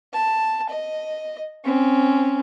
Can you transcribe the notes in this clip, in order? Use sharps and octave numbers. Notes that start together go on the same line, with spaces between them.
A5
D#5
C4 C#4